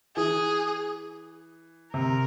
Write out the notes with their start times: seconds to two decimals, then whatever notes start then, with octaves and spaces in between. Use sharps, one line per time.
0.16 E3 G#4
1.93 C3 A#4